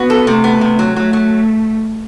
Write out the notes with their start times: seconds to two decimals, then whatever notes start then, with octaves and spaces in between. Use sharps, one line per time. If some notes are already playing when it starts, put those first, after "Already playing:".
Already playing: B3 F#4
0.10 A4
0.27 C3 A3
0.44 B3
0.61 C3
0.79 F#3
0.96 F#3 A3
1.13 F#3